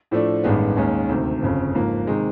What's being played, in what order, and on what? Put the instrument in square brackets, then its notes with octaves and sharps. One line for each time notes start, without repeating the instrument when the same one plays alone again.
[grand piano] A2 F3 A3 D4
A1 G2 D#3 G#3 B3
D#2 D#3 G#3 C#4
D2 C3 D#3
G1 F2 C#3
G#2 F3 A#3
C3 D#3 G#3